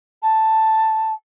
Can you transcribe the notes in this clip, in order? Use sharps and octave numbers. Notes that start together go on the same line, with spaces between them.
A5